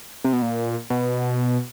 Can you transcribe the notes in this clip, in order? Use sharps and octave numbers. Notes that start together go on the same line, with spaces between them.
C3
B2
A#2
B2